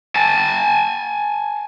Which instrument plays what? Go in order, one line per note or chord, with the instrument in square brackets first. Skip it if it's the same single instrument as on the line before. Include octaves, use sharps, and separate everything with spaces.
[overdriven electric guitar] G#5 A5